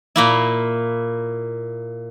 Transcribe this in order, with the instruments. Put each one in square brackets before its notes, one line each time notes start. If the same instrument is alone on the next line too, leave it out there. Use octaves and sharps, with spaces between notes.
[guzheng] A#2 A#3 E4